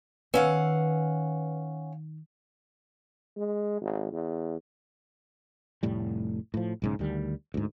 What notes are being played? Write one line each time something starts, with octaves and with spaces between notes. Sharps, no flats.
D#3 C#4 B4 F5 F#5
G#3
G#1
E2
F1 A2 G3
A2 F3
B1 G#2 C#3
D2 D#3 G3
D2 G#2